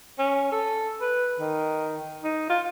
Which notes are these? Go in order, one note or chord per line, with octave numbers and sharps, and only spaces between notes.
C#4
A4
B4
D#3
D#4
F4